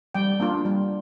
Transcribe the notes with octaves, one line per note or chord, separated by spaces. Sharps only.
G3 G5
A#3 D4 F4
G3